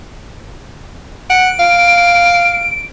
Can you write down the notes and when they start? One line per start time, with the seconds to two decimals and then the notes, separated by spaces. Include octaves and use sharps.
1.30 F#5 D7
1.60 F5